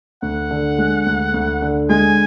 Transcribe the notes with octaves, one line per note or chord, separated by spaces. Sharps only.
D2 F#5
D3
G#3
D2
D2
D3
G#3 G#5